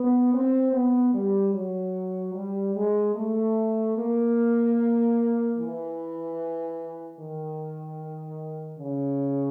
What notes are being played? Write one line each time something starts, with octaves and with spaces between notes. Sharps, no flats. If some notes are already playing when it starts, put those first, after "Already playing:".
Already playing: B3
C4
B3
G3
F#3
G3
G#3
A3
A#3
E3
D#3
C#3